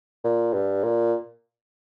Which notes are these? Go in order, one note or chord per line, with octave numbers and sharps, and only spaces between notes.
A#2
G2
A#2